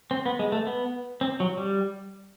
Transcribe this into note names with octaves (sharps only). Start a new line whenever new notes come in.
C4
B3
G#3
A3
B3
C4
F#3
G3